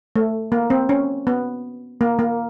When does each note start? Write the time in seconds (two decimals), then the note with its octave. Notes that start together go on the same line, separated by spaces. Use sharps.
0.16 A3
0.52 A#3
0.70 C4
0.89 C#4
1.27 B3
2.01 A#3
2.19 A#3